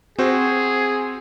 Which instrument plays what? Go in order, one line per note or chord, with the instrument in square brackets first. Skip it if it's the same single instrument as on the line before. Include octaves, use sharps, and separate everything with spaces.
[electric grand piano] C4 F#4 C5 [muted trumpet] G#4